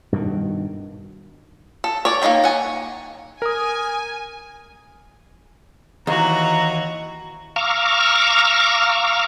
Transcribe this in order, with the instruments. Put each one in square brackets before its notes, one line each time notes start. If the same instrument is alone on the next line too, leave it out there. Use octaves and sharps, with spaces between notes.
[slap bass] G2 B2 D3 D#3
[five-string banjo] A4
C#5 D5
A#3 C4 D#4 C#5 G5
F#5 G#5
[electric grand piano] A#4 D#6 [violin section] G#5
[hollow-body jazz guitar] D#2 [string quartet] E3 F#4 [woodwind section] A#5
[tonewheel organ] F5 A#5 C#6 D6 E6 F6